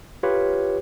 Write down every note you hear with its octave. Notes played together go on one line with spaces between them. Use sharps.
F4 G4 B4 C#5